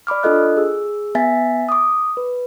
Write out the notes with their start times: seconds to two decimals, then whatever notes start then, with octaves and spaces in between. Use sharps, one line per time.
0.07 D5 B5 D6 F6
0.23 D4 F4 A4 D#5 F#6
0.57 G#4 E6
1.15 B3 E5 G#5 A6 B6
1.69 D6 D#6
2.17 B4